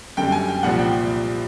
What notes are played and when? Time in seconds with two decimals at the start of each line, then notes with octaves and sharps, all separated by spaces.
0.17 F#2 D3 G3 G5
0.32 G#5
0.48 G5
0.63 C2 A#2 F3 F#5
0.79 G5